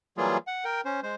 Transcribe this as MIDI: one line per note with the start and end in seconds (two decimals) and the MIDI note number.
0.18 0.38 52
0.18 0.38 54
0.18 0.38 55
0.18 0.38 58
0.18 0.38 65
0.18 0.38 68
0.47 0.64 78
0.64 0.81 70
0.64 0.81 79
0.85 1.00 61
0.85 1.00 72
1.03 1.15 56
1.03 1.15 72